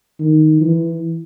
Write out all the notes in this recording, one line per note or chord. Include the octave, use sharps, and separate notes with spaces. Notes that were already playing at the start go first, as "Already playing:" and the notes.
D#3
E3